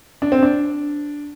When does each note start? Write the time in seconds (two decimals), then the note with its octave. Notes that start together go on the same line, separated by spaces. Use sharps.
0.22 D4
0.32 C4
0.43 D4